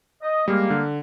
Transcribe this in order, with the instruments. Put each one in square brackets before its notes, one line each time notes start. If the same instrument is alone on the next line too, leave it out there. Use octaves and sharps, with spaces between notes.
[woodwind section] D#5
[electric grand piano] G3 G#3 [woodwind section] A#3
[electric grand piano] D3